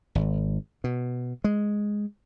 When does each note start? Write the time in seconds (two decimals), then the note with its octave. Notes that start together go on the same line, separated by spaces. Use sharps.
0.15 G#1
0.84 B2
1.44 G#3